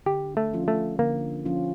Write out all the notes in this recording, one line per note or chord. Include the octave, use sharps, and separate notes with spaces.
D3 G4
A3
F3 C#4 F4
A3
D3 A#3
F3 C#4 F4